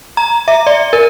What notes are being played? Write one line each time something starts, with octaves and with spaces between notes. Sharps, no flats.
A#5
E5
D5
A#4